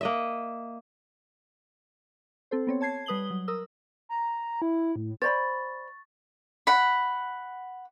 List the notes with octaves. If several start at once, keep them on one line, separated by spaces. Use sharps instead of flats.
A#3 D#5 E5
C4 A4 C5
B3 C4 C#5
C#5 A5 G#6 C7
G3 B4 D#6 F#7 G7
F#3
A#4 D#6 E6
A#5
E4
A2
C5 D5 B5 C#6 A6
F#5 B5